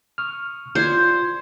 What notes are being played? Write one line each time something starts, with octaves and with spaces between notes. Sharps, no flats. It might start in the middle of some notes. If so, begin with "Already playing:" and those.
C#6 D#6 F6
F4 C5 D5 G#6